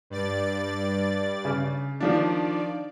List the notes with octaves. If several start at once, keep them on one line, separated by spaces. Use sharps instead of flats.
G2 D5 A6
C#3
D#3 F3 D4 D5